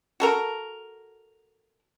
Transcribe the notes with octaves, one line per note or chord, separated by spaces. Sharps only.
F#4 A4 A#4